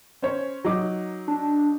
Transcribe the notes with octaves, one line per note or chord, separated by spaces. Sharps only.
C#4 C5 C#5
F#3 D#4 D6
D4